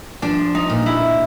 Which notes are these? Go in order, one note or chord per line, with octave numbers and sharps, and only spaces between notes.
F3 D4
D#4
A#2
E4